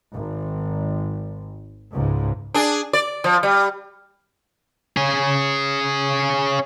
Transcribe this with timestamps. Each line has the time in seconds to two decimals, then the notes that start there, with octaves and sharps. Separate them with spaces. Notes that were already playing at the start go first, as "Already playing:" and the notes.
0.15 G#1
1.93 C#2 G#2
2.54 D4 G#4
2.93 D5
3.24 F3
3.43 G3
4.97 C#4 G#4